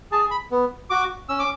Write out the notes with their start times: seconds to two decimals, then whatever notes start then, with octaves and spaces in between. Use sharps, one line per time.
0.11 G#4 A5
0.31 B5
0.51 B3
0.90 F#4 D6
1.29 C#4 E6
1.39 D6